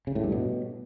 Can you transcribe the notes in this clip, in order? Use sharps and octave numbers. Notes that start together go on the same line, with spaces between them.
C#3
A2
G2
B2